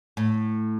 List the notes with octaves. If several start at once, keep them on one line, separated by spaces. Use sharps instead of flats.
A2